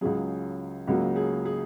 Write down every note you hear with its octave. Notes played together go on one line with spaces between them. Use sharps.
C#2 C#3 F#3 G#4
C#2 C#3 F#3 A#3 F#4
G#4
G#4